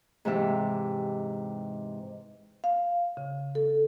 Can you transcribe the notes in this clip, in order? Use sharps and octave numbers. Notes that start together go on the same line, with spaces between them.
G#2 C3 E3 G4 E5
F5
C#3
A4